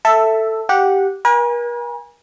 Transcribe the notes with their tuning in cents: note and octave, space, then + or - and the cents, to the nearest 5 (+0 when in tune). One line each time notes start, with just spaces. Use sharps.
A4 +10 E5 +0
G4 -10 F#5 -15
A#4 +45 G#5 -25